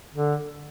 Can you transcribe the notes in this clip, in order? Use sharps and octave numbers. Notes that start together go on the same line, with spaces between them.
D3